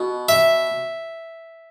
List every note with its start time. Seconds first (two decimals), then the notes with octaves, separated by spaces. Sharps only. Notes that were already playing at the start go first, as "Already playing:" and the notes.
Already playing: B2
0.29 E5